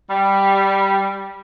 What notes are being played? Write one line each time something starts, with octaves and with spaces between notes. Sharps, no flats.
G3